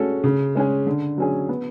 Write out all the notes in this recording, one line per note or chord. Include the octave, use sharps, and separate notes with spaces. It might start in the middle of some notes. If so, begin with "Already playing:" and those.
Already playing: G#3 C#4 F#4 A4
C#3
G#3 C#4 G#4
D3
F#3 C#4 G#4
B3